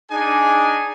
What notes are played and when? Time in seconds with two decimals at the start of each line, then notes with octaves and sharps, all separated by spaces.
0.11 D4 D#4 G#4 G#5